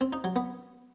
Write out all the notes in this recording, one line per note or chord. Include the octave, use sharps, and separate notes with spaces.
C4
D#4
F#3
B3